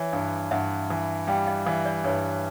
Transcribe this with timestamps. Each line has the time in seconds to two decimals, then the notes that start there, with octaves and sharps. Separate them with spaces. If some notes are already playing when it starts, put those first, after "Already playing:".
Already playing: E3 B4 C#5
0.13 G2
0.51 G2 E5 F#5
0.90 E3
1.27 G3 F5 G5
1.47 D#5 F5
1.66 E3 D#5 F5
1.85 D5 E5
2.04 G2 B4 C#5